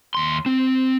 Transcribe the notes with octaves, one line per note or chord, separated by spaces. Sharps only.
D#2 C6
C4